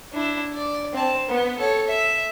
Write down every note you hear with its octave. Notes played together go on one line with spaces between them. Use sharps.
D4 E4
D5
C4 A5
B3
A4 C#5
E5